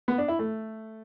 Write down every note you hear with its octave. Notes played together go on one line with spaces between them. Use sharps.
B3
D4
E4
A3